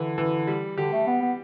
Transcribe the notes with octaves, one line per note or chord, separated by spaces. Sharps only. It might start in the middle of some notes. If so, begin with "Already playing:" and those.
Already playing: D3 E3
E3
G3
D3 G4
A3
B3
B3